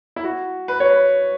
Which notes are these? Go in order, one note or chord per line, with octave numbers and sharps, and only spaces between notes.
E4
F#4
B4
C#5
B4